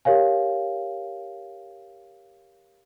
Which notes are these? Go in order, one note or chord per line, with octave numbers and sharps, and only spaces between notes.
G4 A#4 C#5 F5 G#5